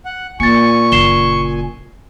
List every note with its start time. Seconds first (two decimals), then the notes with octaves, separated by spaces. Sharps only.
0.05 F#5
0.40 A#2 A#3 G#5 C#6 A6 C#7
0.92 F#1 C7 E7 G7